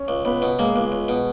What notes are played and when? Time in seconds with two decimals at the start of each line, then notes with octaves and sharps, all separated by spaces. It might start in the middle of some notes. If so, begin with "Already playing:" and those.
Already playing: C#4
0.08 C#2
0.25 C#2 B3
0.42 B2
0.59 G#3 A#3
0.76 C#2
0.92 C#2
1.08 B2